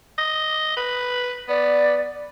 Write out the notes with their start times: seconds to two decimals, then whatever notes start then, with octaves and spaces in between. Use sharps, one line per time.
0.18 D#5
0.77 B4
1.49 B3 D5